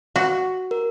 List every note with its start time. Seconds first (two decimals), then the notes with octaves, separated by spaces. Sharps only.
0.16 F#4
0.71 A#4